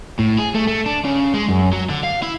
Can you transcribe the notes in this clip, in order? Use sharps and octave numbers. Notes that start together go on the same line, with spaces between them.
A2
G#4
A3
A3
D4
C#3
G#3
F#2
F#3
D3
F5
E4